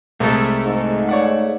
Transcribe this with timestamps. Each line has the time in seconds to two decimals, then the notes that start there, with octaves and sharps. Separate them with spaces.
0.20 C2 G#3 A3 A4
0.64 G#2
1.09 C#5 D5 F#5